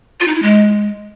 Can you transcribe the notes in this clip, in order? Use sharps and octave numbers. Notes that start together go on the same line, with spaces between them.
F4
D#4
E4
G#3